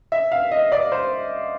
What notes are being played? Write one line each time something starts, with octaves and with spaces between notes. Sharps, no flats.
E5
F5
D#5
D5
C5